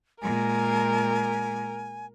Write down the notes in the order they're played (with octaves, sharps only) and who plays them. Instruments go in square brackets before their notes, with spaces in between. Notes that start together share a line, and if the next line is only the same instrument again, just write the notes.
[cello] A#2 G#3 [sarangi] A#4 [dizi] G#5